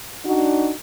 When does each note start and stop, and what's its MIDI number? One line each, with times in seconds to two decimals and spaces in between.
0.25 0.71 62
0.25 0.71 63
0.25 0.71 66